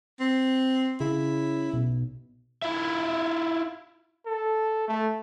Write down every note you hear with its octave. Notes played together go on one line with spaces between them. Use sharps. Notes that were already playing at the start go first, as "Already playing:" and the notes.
C4
C#3 E4
B1
E4 F4 E5
A4
A3